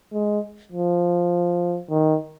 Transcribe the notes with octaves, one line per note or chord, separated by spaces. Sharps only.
G#3
F3
D#3